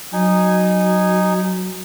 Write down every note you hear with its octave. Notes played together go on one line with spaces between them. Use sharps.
F#3 D#4 G#5